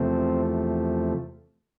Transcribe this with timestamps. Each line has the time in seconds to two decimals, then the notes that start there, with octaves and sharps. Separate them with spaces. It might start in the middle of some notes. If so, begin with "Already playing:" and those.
Already playing: E2 C3 F3 A3 C4